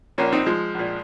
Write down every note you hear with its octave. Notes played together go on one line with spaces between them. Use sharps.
A#1 A#2 A#3 C#4
C4 D#4
F3 G#3
A#1 A#2